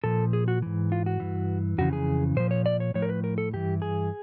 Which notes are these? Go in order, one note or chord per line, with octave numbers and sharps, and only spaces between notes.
A#2 F3 A4
G#4
F#4
G#2 E3
F4
F#4
G2 E3
F2 C#3 E3 F#4
G#4
A#2 F3 C5
C#5
D5
C#5
A2 F3 C#5
A#4
B4
A#4
A4
G2 E3 G4
G#4